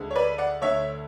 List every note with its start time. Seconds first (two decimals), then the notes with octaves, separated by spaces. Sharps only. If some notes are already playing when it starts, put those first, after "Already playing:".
Already playing: D2 D3 G#3
0.11 C#5
0.16 B4 D5
0.38 D5 F#5
0.61 D2 D3 A3 C#5 E5